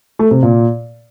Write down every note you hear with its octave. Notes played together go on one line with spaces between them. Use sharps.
A3
C3
A#2